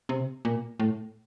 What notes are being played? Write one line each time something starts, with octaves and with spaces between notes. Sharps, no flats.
C3
A#2
A2